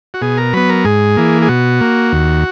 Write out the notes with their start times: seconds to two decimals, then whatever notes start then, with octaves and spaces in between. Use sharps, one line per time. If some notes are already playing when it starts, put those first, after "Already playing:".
0.14 F#4
0.21 B2 G#4
0.37 A#4
0.53 F#3 B3 B4
0.69 A#4
0.85 G#2 G#4
1.17 E3 A#3
1.42 G#4
1.48 B2 F#4
1.81 A#3
2.12 D#2